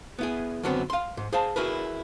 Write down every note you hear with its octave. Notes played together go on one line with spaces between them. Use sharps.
B3 E4 G#4
F#2 D3 F#3 G3 B3 C4
F5 C6
G#2
G#4 C5 F5 A5
E4 F#4 G#4 A#4 B4